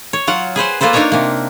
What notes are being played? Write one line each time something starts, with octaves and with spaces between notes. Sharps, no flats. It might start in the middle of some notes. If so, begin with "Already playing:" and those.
C#5
F#3 F4 F#5
G#4 B4 C5 F#5
A#3 F4 A4 B4 C5
A#3 D4 D#4 A#4 C#5 A#5
C3 A#3